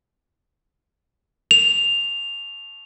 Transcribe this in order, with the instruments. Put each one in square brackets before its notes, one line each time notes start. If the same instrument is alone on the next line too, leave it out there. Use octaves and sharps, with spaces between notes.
[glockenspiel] F7